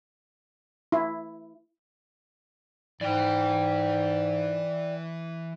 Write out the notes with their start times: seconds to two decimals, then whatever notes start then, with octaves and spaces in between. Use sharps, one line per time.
0.92 E4
3.01 G#2 E3 B4 D5 G5